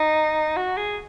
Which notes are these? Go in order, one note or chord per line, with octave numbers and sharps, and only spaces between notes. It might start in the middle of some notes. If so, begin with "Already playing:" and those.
Already playing: D#4
F#4
G#4